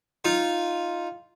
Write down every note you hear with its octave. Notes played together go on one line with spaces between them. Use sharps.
D#4 F4